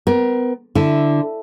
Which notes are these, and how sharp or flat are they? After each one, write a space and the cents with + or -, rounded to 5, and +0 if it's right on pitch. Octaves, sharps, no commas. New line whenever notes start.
B3 +30 A#4 +25
D3 +0 E4 +0